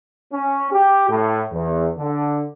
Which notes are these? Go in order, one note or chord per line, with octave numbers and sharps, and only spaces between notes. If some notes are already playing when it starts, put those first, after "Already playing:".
C#4
G4
A2
E2
D3